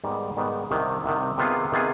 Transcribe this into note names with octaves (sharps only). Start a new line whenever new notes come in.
G#2 D#3 G3 B3
G#2 D#3 G3 B3
C2 C3 D#3
C2 C3 D#3
C3 D#3 B3 F4 G#4
C3 D#3 B3 F4 G#4